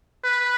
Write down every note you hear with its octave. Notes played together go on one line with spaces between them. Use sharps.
B4